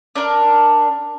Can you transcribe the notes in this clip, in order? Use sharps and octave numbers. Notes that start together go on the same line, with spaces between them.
D4 A#4